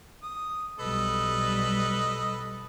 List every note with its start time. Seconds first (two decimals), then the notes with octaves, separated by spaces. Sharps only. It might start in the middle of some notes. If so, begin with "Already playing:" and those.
0.23 D#6
0.79 B1 G3 A4 B4 D#5